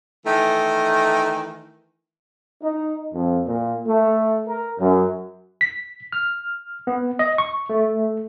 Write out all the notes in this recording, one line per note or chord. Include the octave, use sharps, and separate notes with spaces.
D#3 E3 A3
D#4
F2
A#2
A3
A#4
F#2
B6
F6
B3
D#5
C#6
A3